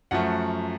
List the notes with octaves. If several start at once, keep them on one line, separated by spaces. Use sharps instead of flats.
F#2 F3 A3 F#5